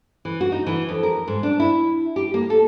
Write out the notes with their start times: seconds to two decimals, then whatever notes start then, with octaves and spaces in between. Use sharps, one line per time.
0.25 E3
0.41 F#4
0.52 D#4
0.67 E3
0.89 F2
1.03 A#4
1.28 G#2
1.43 D4
1.60 E4
2.16 G4
2.34 A#3
2.50 A4